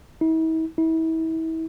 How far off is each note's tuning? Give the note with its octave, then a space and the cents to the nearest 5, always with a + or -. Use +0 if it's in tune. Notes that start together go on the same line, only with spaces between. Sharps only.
E4 -45
E4 -35